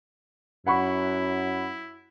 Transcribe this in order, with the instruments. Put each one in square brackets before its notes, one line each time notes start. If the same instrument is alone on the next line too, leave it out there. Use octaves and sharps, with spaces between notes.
[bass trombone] F#2 [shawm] E4 [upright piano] F#5 B5 C#6